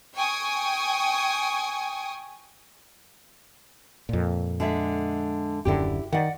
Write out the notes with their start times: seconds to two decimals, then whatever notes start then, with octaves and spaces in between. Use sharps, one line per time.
0.17 G5 G#5 C#6 D#6
4.09 F2 A#2
4.60 D3 G#3 E5
5.65 D#1 F#2 D3 E4 G4
6.12 D#3 D5 F#5